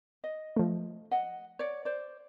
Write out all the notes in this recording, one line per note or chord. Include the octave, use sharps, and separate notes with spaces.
D#5
F3 A3
D#5 F#5
C#5 D5
C5 D5